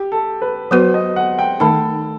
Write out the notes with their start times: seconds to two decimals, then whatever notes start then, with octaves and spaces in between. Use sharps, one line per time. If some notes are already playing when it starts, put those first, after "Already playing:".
Already playing: G4
0.12 A4
0.42 B4
0.71 F#3 B3 F#4 B4 C5
0.94 D#5
1.16 F#5
1.39 G5
1.60 D#3 A3 D#4 A4